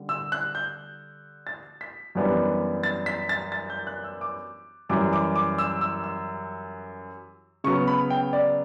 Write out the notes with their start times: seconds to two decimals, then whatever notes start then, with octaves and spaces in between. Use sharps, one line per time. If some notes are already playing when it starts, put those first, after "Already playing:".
Already playing: D3 G3
0.09 E6
0.32 F#6
0.55 G6
1.47 A6
1.81 B6
2.15 F#2 E3 G3 B3 D4
2.83 A6
3.06 B6
3.29 A6
3.52 A6
3.70 G6
3.87 F#6
4.04 E6
4.21 D6
4.89 F#2 E3 G3 D6
5.13 D6
5.36 D6
5.58 E6
5.81 E6
6.04 E6
7.64 C#3 F#3 B3 C#6
7.88 B5
8.10 G5
8.33 D5